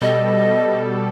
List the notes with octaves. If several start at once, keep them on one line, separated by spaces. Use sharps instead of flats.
B2 G3 A4 D#5